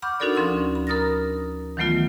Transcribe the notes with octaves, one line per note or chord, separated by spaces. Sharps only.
F#5 B5 C#6 D6 F6 G6
D4 D#4 F#4 A4 A#4 D5
D2 F3 C#4 C6 C#6 E6
B5
A#4 A#5 D#6 F6 A6 A#6
D#3 E3 F#3 A3 B3 F4